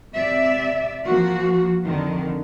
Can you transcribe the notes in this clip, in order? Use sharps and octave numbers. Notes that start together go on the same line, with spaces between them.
C3 D5 E5
F3 A#3 F#4
F2 D3 D#3